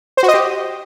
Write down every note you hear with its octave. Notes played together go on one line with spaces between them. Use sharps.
C5
F#4
D#5
G4